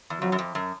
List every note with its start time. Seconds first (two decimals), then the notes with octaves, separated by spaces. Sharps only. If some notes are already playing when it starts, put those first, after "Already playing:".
0.10 E2
0.21 F2 F#3
0.32 F#2
0.39 F2
0.55 F#2